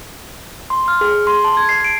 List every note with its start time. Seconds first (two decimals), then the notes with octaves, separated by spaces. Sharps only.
0.70 C6
0.88 F6
1.01 G#4
1.27 C6
1.44 A5
1.57 G#6
1.69 C7
1.85 D7